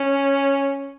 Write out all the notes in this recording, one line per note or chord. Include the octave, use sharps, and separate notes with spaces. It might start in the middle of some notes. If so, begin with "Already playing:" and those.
Already playing: C#4